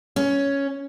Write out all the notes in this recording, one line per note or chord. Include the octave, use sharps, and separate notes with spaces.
C#4